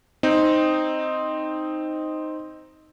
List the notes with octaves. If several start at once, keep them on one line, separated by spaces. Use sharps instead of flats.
C4 D#4